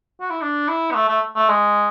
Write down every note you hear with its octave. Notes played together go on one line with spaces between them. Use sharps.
F#4
E4
D4
E4
B3
A3
A3
A3
G#3